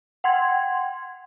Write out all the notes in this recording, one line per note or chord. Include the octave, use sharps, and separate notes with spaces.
F#5 G5 C6 G#6